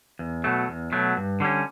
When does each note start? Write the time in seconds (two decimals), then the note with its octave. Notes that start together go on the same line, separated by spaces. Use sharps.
0.19 E2
0.44 B2 F#3 A3
0.68 E2
0.92 B2 F#3 A3
1.17 G2
1.40 D3 G3 C#4